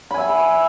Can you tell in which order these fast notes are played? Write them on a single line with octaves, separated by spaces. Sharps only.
B5 G#5 E5